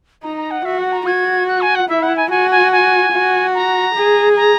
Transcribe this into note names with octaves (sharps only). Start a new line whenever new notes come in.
D#4 A#5
A#5
F#5
F#4 E5
F#5
A#5
F#4 G#6
F#6
G#5
F#5
E4 E5
F#5
G#5
F#4 G#5
G#5
G#5
F#4
A#5
G#4
A#5